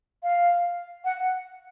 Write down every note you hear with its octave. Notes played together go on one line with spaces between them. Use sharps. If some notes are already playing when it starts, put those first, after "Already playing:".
F5
F#5